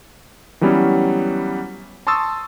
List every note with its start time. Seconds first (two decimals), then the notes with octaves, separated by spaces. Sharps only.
0.61 E3 F#3 G3 B3 C#4
2.07 A5 C6 C#6 D#6 E6 A6